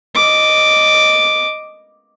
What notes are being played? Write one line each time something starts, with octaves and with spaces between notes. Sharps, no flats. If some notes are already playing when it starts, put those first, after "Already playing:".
D#5 D6